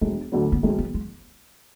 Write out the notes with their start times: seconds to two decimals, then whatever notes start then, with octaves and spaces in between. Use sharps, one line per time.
0.01 E1 D4
0.32 D2 D3 F#3
0.52 B3
0.63 E1 C#4
0.79 B3
0.94 G#3